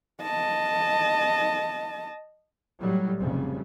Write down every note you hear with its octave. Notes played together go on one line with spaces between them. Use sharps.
D#5 A5
A2 F#3 G3
F1 F2 C#3 G3